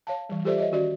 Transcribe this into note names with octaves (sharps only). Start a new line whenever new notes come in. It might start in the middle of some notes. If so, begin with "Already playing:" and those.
C#5 F5 A5
E3 G3
F4 G4 A4 C5 D5 E5
C#5 D#5 E5
D#3 C#4 F#4 D5